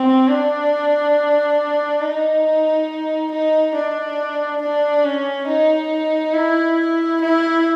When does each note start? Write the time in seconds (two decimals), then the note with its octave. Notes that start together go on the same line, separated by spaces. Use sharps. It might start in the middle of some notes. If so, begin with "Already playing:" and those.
Already playing: C4
0.28 D4
2.01 D#4
3.32 D#4
3.75 D4
4.61 D4
5.05 C#4
5.48 D#4
6.34 E4
7.21 E4